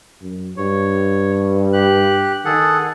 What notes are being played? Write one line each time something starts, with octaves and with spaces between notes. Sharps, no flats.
F#2
G2 C#5
G4 F#6
D#3 G#4 A4 F#5